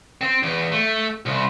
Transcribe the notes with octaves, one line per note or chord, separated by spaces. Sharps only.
C4
E2
A3
C2